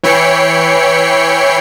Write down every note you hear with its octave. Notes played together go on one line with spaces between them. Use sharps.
E3 C#5 G5 B5 C7 C#7